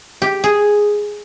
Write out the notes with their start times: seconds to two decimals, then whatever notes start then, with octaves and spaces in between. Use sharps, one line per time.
0.22 G4
0.44 G#4